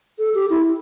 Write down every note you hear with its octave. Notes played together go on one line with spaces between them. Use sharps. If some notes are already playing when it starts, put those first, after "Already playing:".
A4
G4
E4